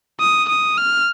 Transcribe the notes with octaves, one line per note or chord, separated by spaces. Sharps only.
D#6
D#6
F6